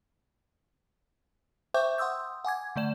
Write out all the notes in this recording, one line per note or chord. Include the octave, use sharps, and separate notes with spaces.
C5 E5 G5 C#6 D6 G6
F#5 C6 D#6 E6 G6
F#5 G#5 D6 G#6
D3 A3 D5 E7